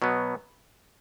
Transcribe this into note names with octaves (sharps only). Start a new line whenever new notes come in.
B2 F#3 B3